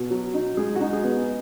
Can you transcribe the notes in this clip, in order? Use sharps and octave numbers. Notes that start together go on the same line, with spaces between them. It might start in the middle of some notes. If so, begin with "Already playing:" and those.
Already playing: B2
F#3
D#4
G#3 G#4
F#4
D#4
G#4
B3